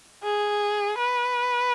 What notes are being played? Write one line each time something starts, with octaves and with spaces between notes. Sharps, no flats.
G#4
B4